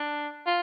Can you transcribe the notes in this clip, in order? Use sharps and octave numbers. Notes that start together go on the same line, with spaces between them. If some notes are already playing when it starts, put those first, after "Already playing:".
Already playing: D4
F4